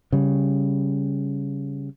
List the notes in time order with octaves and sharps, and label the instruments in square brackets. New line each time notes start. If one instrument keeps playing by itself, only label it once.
[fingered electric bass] C#3 G3